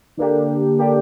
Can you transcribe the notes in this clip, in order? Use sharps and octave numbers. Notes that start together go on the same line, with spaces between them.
D3 A#3 D4 G4
D3 A#3 D4 G4